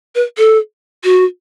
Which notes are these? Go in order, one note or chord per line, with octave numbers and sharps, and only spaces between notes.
B4
A4
F#4